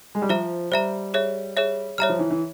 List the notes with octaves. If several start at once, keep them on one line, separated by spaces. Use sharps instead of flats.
G#3
G3
F3 C5 E5 A#5
G3 C5 E5 A#5
G#4 C#5 E5
G#4 C#5 E5
G3 C#5 E5 A#5 F6
F3
E3
E3